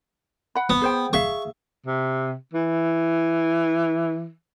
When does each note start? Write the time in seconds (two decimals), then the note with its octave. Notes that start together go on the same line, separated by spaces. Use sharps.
0.55 F#5 B5
0.70 B3
0.82 G#4 C5 G5
1.13 G#4 E5 F5 C#6
1.86 C3
2.53 E3